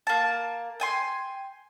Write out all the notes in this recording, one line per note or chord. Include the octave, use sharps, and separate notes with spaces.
A#3 A5
G5 G#5 C6